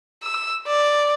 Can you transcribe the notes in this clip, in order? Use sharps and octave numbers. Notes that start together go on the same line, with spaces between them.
E6
D5